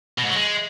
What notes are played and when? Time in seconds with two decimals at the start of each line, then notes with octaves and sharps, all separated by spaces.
0.19 B2
0.24 G#2
0.30 F#3
0.36 G#3